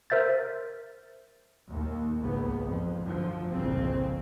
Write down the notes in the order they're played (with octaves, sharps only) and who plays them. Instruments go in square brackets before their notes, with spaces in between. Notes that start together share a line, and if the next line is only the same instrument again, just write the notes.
[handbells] A#4 C5 E5 G6 A6
[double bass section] D#2
G#1 C#2 C#3 B3
F2
F#2 D3 F3
G1 C2 F2 A#2 C#3 C4